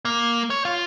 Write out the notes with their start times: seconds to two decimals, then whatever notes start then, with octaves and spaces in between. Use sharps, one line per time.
0.05 A#3
0.50 C#5
0.65 F4